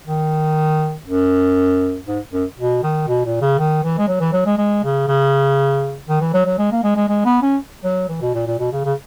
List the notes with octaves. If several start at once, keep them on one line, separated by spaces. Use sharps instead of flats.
D#3
F#2
G#2
F#2
B2
D#3
B2
A#2
C#3
D#3
E3
G#3
F#3
E3
F#3
G#3
G#3
C#3
C#3
D#3
E3
F#3
F#3
G#3
A#3
G#3
G#3
G#3
B3
C#4
F#3
E3
B2
A#2
A#2
B2
C#3
C#3